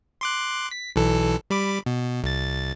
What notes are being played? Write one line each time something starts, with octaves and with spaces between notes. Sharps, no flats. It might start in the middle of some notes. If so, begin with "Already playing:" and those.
C6 D6 F#6
B6
B1 E3 A4
G3 B5 D6
B2
C2 A6